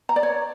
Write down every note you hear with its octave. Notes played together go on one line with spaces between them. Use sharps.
A#5
D5
C#5